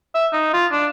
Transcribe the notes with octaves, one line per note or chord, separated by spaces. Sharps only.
E5
D#4
F4
D4